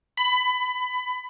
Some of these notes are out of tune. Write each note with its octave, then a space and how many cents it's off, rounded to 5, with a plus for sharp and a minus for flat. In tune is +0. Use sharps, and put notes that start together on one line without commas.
B5 +20